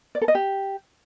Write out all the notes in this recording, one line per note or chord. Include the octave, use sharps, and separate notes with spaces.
D5
A4
D#5
G4